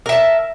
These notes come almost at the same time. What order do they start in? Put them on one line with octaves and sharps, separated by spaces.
A#4 E5 A5